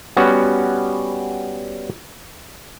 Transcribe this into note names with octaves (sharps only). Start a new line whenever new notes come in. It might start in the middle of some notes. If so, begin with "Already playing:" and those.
G3 B3 C#4 F#4